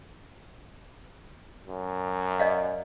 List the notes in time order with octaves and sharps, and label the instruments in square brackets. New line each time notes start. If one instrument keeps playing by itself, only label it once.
[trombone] F#2
[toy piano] D5 D#5 F5